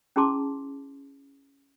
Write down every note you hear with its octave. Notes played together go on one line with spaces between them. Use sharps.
C#4 E4 G#4 A5 C6 D6